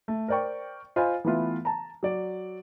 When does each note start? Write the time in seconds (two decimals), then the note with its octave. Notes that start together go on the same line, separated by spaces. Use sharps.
0.08 A3
0.28 A#4 C5 D5 G5 C#6
0.96 F4 C5 D#5 F5 G#5 B5
1.25 E3 A3 B3 E4 F4
1.65 A5 A#5
2.03 F#3 D5